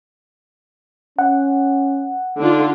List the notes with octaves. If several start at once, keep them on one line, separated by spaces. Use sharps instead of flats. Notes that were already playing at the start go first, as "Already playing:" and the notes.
C#4 F#5
D3 D4 D#4 F4